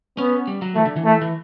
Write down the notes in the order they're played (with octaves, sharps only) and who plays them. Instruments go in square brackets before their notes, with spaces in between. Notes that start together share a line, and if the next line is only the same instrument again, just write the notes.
[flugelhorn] B3 [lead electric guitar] C#4
[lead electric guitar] G3
F#3
[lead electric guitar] E3 [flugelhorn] A3
[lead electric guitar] D3
E3
[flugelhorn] A3
[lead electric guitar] E3